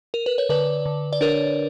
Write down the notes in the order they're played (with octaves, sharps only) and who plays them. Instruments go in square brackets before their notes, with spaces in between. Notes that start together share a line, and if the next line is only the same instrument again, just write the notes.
[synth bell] A#4
B4
C#5
D3 B4 D5
D3
D5
D4 A#4 C#5